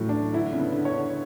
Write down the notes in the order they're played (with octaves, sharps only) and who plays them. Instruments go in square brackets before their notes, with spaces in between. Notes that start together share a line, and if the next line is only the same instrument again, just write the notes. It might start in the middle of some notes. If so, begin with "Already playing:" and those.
Already playing: [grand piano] A2 F#3 [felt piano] E3
[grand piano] D4
[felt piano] D3 [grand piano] E4
[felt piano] C#3
[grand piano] B3
[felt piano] D3
[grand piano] C#5
[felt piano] D3